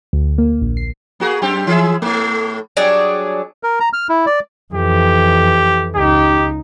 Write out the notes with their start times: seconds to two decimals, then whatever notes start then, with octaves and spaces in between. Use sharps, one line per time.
0.13 D2
0.38 A#3
0.61 A#1
0.77 C7
1.20 A#3 F#4 G#4
1.42 F#2 C4 G4
1.67 E3 G#4 E5
2.02 A2 A3
2.77 F#3 G3 D4 G#4
3.63 A#4
3.80 A#5
3.93 F6
4.09 E4
4.26 D5
4.74 F2 E3 G4
5.96 C#2 D#4 G4